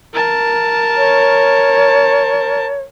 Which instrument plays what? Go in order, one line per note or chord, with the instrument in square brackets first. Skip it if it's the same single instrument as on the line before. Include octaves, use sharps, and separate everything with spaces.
[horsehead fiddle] A#4 A5
[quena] C#5